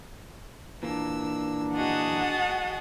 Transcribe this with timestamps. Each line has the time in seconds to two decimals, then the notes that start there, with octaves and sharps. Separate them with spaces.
0.83 A#2 E3 A#3 D4 E6
1.74 F#4 G#4 D#5 F#5 A5